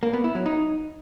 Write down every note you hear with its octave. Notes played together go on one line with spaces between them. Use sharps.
A#3
B3
E4
F#3
D#4